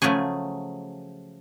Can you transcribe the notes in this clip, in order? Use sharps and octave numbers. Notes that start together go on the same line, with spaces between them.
C#3 F3 F#3 A3 G#4